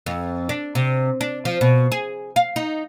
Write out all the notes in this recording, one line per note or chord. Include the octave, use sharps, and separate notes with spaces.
F2
D4
C3
D4
F3
B2
G#4
F5
D#4